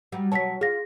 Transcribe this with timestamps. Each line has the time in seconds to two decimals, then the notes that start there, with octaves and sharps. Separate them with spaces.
0.12 F#3 G3
0.32 B2 F#3 C#5 A5 B6
0.61 F4 G#4 A#6